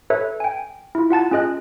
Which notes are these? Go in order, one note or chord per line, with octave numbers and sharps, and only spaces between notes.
A4 B4 C#5 E5
G5 G#5
E4 F4
F4 F#5 A5 A6
C#4 F4 G#4 D#5 F#6